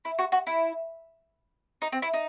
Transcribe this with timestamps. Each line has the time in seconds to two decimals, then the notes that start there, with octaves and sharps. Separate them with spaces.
0.05 E4
0.19 F#4
0.32 F#4
0.47 E4
1.82 D#4
1.92 C4
2.02 E4
2.14 D#4